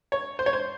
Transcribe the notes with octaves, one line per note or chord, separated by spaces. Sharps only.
C#5
C5
C#5
C5